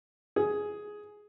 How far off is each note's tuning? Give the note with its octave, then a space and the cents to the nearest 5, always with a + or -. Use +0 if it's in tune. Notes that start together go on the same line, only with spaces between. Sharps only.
G#4 +10